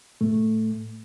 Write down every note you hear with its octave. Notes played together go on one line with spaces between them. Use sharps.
A2 A3